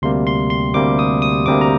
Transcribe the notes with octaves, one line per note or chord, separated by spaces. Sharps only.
D2 C3 G3 A#3 C6
C6
C6
D2 C3 G3 A#3 D6
D#6
D#6
D2 C3 G3 A#3 D6
A#5